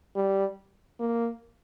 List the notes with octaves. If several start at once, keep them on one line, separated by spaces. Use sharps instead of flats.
G3
A#3